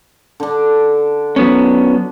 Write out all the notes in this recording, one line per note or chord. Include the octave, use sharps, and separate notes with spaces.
D3 D4
F#3 B3 C#4